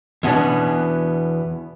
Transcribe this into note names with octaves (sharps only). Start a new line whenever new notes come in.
E2 B2 B3 C#4 D4